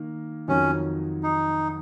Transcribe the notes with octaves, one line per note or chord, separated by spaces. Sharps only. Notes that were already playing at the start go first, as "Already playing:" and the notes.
Already playing: D#3 A#3
F2 D#3 F#3 C#4
D#4